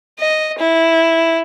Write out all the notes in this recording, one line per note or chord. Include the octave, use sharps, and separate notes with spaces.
D#5
E4